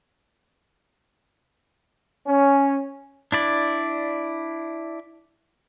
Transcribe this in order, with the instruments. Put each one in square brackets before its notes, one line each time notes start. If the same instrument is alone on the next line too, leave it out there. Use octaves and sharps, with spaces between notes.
[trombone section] C#4
[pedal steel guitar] D4 E4 D5